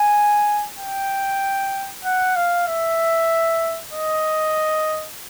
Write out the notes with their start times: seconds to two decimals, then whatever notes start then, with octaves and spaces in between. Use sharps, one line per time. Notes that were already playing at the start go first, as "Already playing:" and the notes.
Already playing: G#5
0.79 G5
2.05 F#5
2.36 F5
2.67 E5
3.93 D#5